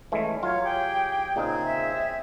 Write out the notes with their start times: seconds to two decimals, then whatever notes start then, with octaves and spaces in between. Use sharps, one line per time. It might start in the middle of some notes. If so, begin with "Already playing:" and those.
0.12 E3 G#3 A3 C#4
0.43 F#3 F4 C#5 F5
0.64 G4 G#4 G5
1.36 A#2 C#3 C4 D#4 G#4
1.65 E5